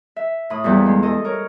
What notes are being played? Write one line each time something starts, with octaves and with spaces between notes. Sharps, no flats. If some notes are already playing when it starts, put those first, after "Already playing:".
E5
A2 B5 D#6
E2 A#2 G3 A4
G#3
A4 D#5
A#4 C#5